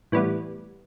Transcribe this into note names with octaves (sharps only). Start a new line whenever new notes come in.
A2 E3 G3 B3